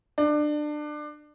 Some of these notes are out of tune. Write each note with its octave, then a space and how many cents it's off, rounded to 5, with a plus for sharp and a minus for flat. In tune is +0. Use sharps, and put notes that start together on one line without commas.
D4 +25